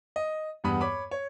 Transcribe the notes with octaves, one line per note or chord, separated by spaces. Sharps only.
D#5
E2 G2 B3 B5 D#6
C#5 B5 D6
C#5